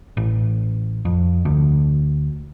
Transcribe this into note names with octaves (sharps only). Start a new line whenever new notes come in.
A1
F2
D2